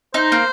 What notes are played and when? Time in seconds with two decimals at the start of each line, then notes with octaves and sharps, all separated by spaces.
0.14 D#4 C5
0.32 A#3